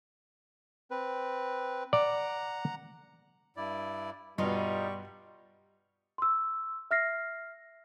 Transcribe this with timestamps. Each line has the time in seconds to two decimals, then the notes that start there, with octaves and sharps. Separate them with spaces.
0.91 C4 B4
1.93 D5 F#5 A#5
3.57 G2 E4 D5
4.38 G2 B2 G3 D#4 F4 C#6
6.18 C6 E6
6.91 E5 F6 A#6 C7